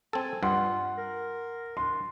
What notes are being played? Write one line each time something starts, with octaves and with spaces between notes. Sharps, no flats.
C4 A4 G#5
G2 G3 F4 F#5 C6
A#4
D4 C6